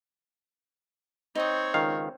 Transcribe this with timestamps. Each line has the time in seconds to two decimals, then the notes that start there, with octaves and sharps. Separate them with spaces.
1.35 C4 D#4 C#5 G5 D#6
1.74 C#2 D#3 F5